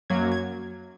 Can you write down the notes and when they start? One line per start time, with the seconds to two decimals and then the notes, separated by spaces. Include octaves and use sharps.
0.10 F#2 F#3 A#3 G#6
0.32 G#6